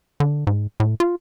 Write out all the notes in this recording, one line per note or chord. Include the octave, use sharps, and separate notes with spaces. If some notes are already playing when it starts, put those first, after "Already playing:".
D3
G#2
A2
F4